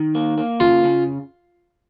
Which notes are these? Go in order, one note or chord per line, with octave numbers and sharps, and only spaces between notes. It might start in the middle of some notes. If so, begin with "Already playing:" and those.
Already playing: D#3
A#3
A#3
C#3 F4
C#3